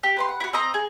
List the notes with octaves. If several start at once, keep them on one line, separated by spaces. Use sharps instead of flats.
G4
B4 B5 C6
F#5
E4 F#4
C4 D#5 A#5
G#4